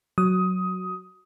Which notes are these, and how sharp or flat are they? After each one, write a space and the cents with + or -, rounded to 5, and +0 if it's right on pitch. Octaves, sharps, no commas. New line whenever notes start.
F#3 +0 D#6 +15